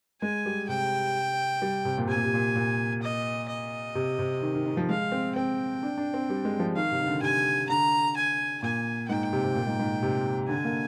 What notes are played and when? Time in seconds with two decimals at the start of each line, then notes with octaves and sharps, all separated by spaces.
0.22 G#3 G#5
0.46 G3
0.68 C3 G5
1.62 G3
1.85 C3
1.98 A#2
2.07 C3 G#5
2.15 A#2
2.24 C3
2.34 A#2
2.55 A#2
3.02 D#5
3.49 D#5
3.95 C3
4.19 C3
4.42 D#3
4.55 D#3
4.66 D#3
4.77 F3
4.89 G#3 F5
5.12 C4
5.36 C4 G5
5.83 D4
5.98 D4
6.14 C4
6.30 G3
6.45 G#3
6.59 F3
6.76 D#3 F5
6.92 C3
7.01 D#3
7.07 D3
7.22 C3 G#5
7.69 D3 A#5
8.16 G#5
8.62 A#2 G#5
9.08 G#2 G5
9.33 C3
9.44 C3
9.55 A#2
9.67 G#2
9.79 G#2
10.03 C3
10.49 D3 G#5
10.64 A#3